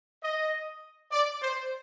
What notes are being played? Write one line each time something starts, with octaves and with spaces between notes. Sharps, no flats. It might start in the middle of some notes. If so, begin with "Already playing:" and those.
D#5
D5
C5